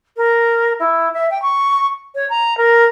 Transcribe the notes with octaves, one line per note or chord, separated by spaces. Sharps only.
A#4
E4
E5
G5
C#6
C#5
A#5
A#4